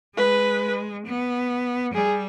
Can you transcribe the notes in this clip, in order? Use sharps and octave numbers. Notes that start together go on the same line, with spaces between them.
G#3 B4
B3
G3 G#4